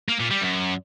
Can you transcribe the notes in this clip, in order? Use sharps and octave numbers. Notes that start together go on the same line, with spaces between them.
A#3
A#2
G3
F#2